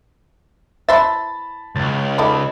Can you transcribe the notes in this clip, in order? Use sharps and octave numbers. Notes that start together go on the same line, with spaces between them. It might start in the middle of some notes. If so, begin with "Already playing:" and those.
E3 C5 E5 A5 B5 A6
C#2 A6
D#4 A4 D5 B5